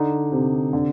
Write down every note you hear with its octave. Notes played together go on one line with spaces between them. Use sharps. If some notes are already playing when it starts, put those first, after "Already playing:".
Already playing: D3 D#4
C3
D3